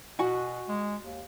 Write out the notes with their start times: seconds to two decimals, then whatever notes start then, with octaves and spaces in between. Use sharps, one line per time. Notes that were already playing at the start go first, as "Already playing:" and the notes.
0.19 B2 F#4 F#5 G#5
0.68 G#3
1.03 D#2